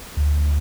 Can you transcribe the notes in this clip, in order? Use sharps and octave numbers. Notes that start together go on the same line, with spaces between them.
D2